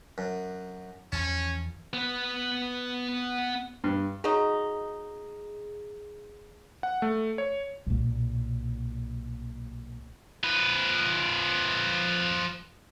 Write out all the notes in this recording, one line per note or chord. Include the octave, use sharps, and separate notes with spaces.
F#2
E2 E3 F3 C#4 A5
B3 B4
G2
F#3 D#4 G#4
F#5
A3
C#5
B1 A#2
F3 B4